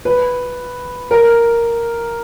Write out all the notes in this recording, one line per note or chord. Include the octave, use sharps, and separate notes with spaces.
B4
A#4